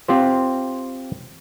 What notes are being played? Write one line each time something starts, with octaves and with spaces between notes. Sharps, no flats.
C4 F4 G4 C5